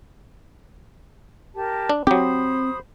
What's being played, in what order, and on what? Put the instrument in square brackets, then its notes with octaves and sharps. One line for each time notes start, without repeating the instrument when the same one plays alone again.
[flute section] G4 A#4 A5
[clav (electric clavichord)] D4
[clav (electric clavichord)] F#3 G4 [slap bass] C4 [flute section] C5 B5 D#6